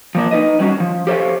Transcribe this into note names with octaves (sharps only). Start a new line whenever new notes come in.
F3 A#3 D4
D#4 B4 D#5
F#3 G3 C#4 F#4
F3
G4 A4 C5 C#5 E5 F5